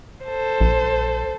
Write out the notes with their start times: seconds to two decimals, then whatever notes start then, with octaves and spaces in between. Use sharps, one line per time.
0.24 A4 C5
0.61 A#1